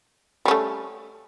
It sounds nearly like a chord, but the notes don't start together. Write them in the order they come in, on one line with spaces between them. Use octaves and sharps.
G3 C#4 A3